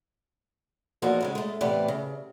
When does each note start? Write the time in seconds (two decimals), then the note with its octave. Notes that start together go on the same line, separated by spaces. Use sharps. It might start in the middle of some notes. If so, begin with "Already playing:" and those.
1.02 E2 F3 A#3 D#4 F#4 G#4
1.21 D#2 C#3 G#3
1.35 G#3 A3
1.61 A2 C3 E3 B3 G4 D5
1.88 C#3